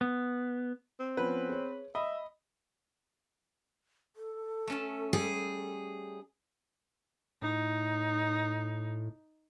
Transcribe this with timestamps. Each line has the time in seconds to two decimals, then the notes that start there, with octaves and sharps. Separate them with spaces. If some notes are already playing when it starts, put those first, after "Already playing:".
0.01 B3
1.00 C4
1.17 F3 B3 C#4 B4
1.49 G#4 C#5
1.95 D#5 E5 B5
4.16 A4
4.67 A3 C#4 A5
5.13 G3 G#4
7.42 A2 D#4